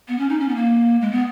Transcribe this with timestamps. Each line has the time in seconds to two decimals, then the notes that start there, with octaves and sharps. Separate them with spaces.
0.08 B3
0.19 C#4
0.29 D#4
0.40 C#4
0.49 B3
0.55 A#3
1.01 G#3
1.12 B3